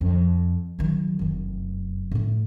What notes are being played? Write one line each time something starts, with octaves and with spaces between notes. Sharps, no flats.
F2
D#3 F#3
F1 F#2
A2 A3